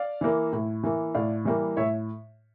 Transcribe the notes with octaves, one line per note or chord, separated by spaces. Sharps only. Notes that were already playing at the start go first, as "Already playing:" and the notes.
Already playing: D5 F5
E3 A#3
A2
E3 A#3
A2 D5 F5
E3 G3 A#3
A2 C#5 E5